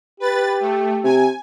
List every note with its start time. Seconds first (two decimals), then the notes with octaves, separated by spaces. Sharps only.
0.20 G4 B4 A6
0.60 A3
1.04 C3 G#5